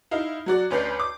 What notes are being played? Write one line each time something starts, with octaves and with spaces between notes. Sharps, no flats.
D#4 E4 F5
F#3 F#4 D5
D2 C#4 B4 D5 G6 C7
D6